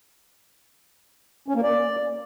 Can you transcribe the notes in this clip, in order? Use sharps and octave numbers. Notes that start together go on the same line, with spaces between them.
C#4
A#3
D5